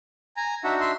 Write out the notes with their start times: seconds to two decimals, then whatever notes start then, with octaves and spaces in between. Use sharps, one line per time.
0.37 G#5 A#5
0.64 D4 D#4 F#4 E5 F#5
0.80 E5 C6